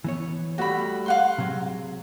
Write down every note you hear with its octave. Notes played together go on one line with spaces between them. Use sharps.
E3 B3 C#5
G3 A3 F#4 G4 B5
F5 F#5 C6
C3 F#3 G#3